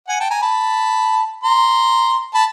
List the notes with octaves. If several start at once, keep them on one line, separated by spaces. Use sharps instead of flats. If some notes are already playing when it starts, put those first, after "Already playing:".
F#5 G#5
G5 A5
G#5 A#5
A5 B5
A#5 C6
A5 B5